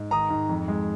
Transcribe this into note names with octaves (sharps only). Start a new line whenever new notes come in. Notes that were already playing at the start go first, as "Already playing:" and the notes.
Already playing: G#2
D#3 A#5 D#6
G#2
F2
G#3